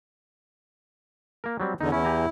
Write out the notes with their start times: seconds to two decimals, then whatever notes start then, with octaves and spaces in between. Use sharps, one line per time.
1.44 A#3 A#4
1.60 F#3 G3 C4
1.81 E2 D3 D#4
1.92 E2 C#4 E4
2.05 G4 G#5 A#5